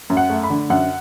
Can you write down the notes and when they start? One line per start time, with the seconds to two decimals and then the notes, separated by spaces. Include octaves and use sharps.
0.10 F#2
0.17 F#5
0.30 A3
0.43 B5
0.50 D3
0.70 F#2 F#5